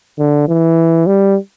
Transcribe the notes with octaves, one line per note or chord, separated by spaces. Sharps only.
D3
E3
G3